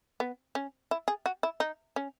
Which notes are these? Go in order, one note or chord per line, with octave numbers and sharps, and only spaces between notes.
B3
C#4
E4
G#4
F#4
E4
D#4
C#4